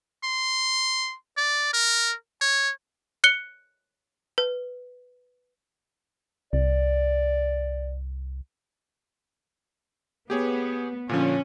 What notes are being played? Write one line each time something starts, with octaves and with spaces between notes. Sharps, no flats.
C6
D5
A#4
C#5
F#6 C#7 G7
B4
C2 D5
B3 G4 G#4 C#5
A#2 D3 F3 C#4